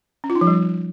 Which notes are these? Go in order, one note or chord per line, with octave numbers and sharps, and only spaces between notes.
C#4
F4
D#4
F3
G3